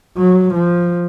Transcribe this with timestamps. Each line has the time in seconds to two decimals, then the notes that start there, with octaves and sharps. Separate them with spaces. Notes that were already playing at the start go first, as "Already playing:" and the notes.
0.18 F#3
0.54 F3